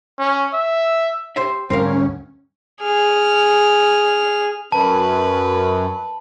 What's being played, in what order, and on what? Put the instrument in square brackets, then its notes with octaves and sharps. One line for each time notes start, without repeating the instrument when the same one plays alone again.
[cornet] C#4
E5
[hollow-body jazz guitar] G4 C5 E5
[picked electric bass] D2 G#2 G3 [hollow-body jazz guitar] C4 A#4 F5 [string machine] C#4
[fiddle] G#4 F6
[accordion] F#2 [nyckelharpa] B4 [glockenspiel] A5